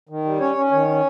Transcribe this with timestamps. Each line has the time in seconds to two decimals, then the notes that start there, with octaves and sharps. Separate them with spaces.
0.09 D#3
0.25 G3
0.40 C#4 C#5
0.56 C#4
0.71 D#3 C#5
0.88 C#4